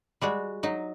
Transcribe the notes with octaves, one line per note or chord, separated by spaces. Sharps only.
G3 G#3 F#4
F#3 D#4